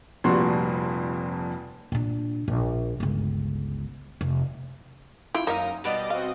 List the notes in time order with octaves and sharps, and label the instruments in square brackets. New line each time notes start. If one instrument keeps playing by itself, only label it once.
[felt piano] F1 F2 A#2 G3 F#4 C6
[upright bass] A#2 D4
A#1
G1 C#2
F1
[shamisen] E4 F4 [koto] G5 [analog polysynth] C#7
[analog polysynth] F#2 A#5 D#7 [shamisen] A#3 E5 F5 [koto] D#4
[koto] B2 B3 D5 [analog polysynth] G3 D#5 D6
[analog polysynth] C4 F#4 D#5 [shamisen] F5